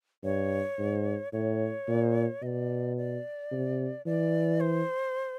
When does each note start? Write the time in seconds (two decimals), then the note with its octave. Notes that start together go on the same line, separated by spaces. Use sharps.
0.24 G2 C#5
0.79 G#2
1.33 A2 C#5
1.88 A#2
2.42 B2 D#5
2.47 D5
2.97 D5
3.52 C3
4.06 E3 D5
4.60 C5